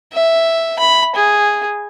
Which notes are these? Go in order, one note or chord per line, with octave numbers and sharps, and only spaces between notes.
E5
B5
G#4